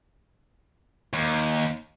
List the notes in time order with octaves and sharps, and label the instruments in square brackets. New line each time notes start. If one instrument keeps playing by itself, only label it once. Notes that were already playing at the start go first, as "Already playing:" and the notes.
[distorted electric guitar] D#2